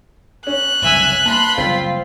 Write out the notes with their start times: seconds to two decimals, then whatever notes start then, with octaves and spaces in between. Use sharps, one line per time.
0.47 C#4 F#6
0.82 F#1 C2 G2 E5 G#5
1.26 A#3 A5 B5 C6 F#7
1.58 F#1 G3 C4 F4 B6